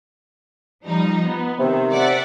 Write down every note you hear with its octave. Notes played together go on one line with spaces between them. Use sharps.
F3 G3 D#4
B3
C3 D#3
D5 E5 F#5